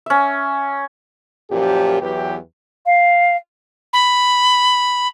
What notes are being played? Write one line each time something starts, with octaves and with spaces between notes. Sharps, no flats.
C#4 E5
F#2 A#2 F3 G4
E2 E3 F#3 G4
F5
B5